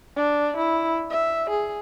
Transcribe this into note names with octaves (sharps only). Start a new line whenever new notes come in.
D4
E4
E5
G#4